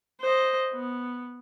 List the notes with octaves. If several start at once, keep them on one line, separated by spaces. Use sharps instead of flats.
C5 D#5
B3